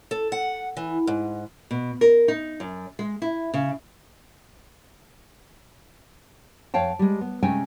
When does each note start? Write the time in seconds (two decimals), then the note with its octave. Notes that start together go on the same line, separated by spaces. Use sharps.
0.11 A4
0.32 F#5
0.77 E3
1.07 G#2
1.71 B2
2.01 A#4
2.28 D#4
2.60 F#2
2.99 G#3
3.22 E4
3.54 C#3
6.74 F2 C#5 F5 G5 A5
6.99 G3 G#3
7.21 B3
7.42 C3 G#3 A3 C#4 G5 G#5